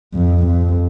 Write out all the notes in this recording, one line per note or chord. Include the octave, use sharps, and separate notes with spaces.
F2
F2